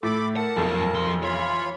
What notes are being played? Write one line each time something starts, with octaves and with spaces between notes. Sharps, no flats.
A2 A4 B5 D6
A#4 F#5 A5
F1 B1 F#2 F3
F3 C6
E3 F4 C#5 B5 C6